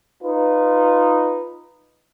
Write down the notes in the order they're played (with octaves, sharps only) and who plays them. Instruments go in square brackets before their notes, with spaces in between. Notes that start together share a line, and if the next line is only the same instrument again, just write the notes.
[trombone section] D#4 F4 B4